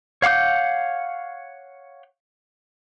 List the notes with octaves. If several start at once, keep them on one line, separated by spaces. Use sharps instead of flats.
C#5 F5 F#5 D6 G6